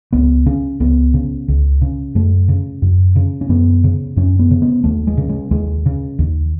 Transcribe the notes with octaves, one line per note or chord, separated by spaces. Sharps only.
C#2 B3
C#3 C#4
C#2 B3
C#3
C#2
C#3
F#2 A3
C#3
F#2
C#3
C#4
F#2 B3
C#3
F#2 C#4
B3
C#3
B3
D#2 A3
G#3
C#3
G#3
D#2 G#3
C#3
D#2